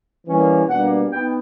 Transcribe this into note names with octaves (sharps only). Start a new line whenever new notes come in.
E3 G3 A#3 C#4
B2 G3 A#3 D4 F#5
B3 D#4 G5